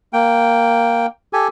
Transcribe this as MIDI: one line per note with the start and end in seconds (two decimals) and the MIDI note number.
0.13 1.06 58
0.13 1.06 79
1.33 1.48 67
1.33 1.48 69
1.33 1.48 80